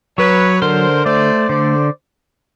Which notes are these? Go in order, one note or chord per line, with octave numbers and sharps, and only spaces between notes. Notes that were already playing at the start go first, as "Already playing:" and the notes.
F#3 B4 C#5
D3 A#4 C5
A3 C5 D5
D3 C5 D5